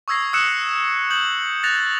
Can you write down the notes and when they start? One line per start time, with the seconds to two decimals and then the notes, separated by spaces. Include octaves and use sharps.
0.08 C#6 D#6 E6 G#6 A#6 C7
0.33 D#6 E6 F#6 C#7 E7 F#7
1.10 D#6 G6 F#7
1.63 F#6 A6 A#6 F7